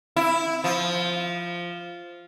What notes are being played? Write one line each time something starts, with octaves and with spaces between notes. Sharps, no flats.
E4
F3